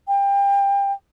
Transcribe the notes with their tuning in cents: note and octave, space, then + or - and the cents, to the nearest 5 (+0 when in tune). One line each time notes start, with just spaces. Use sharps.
G5 +25